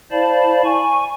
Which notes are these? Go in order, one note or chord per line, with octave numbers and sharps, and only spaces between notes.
E4 C5 D5 F5 A5 B5
G#5 C#6